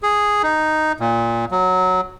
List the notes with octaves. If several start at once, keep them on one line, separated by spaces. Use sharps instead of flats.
G#4
D#4
A#2
F#3